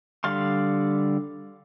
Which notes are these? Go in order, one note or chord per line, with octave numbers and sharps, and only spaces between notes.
D3 G3 D5 F5 C6